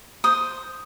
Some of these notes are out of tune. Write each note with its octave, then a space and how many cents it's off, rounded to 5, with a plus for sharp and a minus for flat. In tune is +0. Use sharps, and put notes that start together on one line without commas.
C5 +0 D#6 +0